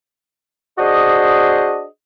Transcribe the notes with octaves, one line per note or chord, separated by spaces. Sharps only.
D4 F#4 G#4 C5 D#5